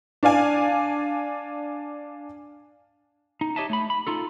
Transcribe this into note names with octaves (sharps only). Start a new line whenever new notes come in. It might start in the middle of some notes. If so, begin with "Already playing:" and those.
D4 D5 F5 G#5
D#4
G4 C#5 D#5 E5 A5
A3 B5
B5
D#4 F4 A4